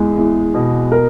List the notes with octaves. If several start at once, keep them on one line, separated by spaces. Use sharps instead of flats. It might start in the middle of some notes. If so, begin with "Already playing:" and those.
Already playing: E2 G#3
E2
B2
A#4